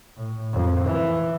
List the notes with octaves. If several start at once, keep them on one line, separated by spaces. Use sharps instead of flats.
A2
F2
E3